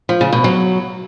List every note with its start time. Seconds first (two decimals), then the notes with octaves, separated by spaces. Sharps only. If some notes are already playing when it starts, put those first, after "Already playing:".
0.09 F3
0.21 C#3
0.33 B2
0.44 F#3